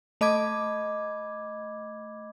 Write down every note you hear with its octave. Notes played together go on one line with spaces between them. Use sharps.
A3 D#5 B5 D6 G#6